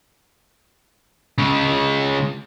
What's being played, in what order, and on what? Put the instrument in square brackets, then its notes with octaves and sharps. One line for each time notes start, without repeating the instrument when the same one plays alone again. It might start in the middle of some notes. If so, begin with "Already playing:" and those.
[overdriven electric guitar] C#3 G#3